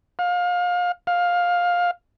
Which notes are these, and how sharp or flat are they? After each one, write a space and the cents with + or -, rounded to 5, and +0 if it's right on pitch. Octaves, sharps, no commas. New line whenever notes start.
F5 +30
F5 +15